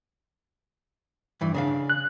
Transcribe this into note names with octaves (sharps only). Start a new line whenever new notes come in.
G2 E3
C#3 D4 F5
F#6